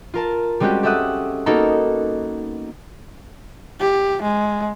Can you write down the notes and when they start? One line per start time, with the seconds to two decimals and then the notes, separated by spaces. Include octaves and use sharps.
0.14 F4 A#4 A5
0.60 G3 G#3 C4 C#4 F#4 G4
0.83 G4 A4 E5 F#5 D#6 F#6
1.46 A#3 B3 D#4 F#4 A4 A#4
3.80 G4
4.22 G#3